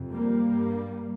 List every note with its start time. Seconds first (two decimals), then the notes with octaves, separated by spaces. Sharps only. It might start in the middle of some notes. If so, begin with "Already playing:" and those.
Already playing: F2 C3
0.13 G3 A#3
0.42 G2